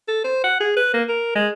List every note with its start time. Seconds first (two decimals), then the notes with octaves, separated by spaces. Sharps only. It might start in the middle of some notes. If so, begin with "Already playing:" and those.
0.08 A4
0.24 C5
0.44 F#5
0.60 G#4
0.77 B4
0.94 A#3
1.09 A#4
1.36 G#3